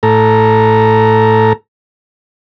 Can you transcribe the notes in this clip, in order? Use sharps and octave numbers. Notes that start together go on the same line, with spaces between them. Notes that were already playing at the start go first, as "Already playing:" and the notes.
A2 A4 A#5